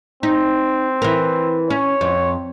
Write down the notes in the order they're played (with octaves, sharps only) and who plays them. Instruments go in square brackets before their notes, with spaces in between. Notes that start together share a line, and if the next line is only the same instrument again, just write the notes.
[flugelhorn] C4 [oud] D#4
[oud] E3 A#4
[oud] C#4 [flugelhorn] C#5
[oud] F2